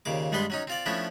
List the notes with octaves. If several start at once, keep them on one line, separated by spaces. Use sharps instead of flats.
D#2 A#2 C#3 D6
G2 G3 G#3 B3 B4 C6
F#3 C#4 D#4
C4 F4 D5
F3 A3 B3 C#4 D4 E4